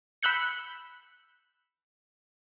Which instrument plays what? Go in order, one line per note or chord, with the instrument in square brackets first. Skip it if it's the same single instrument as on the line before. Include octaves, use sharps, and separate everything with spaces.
[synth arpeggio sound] B5 E6 F#6 G6 C#7